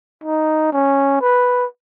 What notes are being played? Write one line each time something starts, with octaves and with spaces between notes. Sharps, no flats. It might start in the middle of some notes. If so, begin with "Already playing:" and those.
D#4
C#4
B4